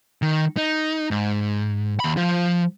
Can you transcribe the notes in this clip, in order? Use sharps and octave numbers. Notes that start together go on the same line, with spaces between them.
D#3
D#4
G#2
D#2 B5
F3 F4